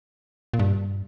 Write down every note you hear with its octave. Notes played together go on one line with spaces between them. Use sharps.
A#2
G2